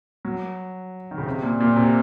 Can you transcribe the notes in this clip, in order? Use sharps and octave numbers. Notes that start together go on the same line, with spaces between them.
F#3
D#3
C#3
C3
A#2
A#2
C3